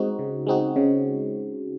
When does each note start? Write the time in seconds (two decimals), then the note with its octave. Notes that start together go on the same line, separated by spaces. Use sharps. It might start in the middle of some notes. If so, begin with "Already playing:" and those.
Already playing: G#3 C4 D#4 F#4
0.19 C#3
0.47 G#3 C4 D#4 F#4
0.76 C#3